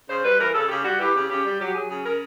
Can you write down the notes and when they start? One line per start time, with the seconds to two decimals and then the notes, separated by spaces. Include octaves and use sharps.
0.09 C#3 C5
0.24 G3 B4
0.39 E3 A#4
0.54 C#3 A4
0.69 C#3 G4
0.84 G3 F#4
0.99 E3 G4
1.15 C#3
1.30 C#3 G4
1.45 G3
1.60 F#3 G4
1.75 F#3 G#4
1.90 C#3 G#4
2.05 C#3 A#4